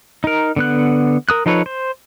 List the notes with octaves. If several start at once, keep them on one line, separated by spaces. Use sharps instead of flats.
D#4 A#4
D3 B3 F#6
A#4 D#6 F#6
F3 D#4 A4 B4 C#5
C5